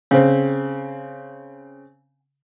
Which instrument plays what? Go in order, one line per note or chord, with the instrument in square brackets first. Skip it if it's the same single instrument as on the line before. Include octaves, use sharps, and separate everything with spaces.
[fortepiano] C#3 C4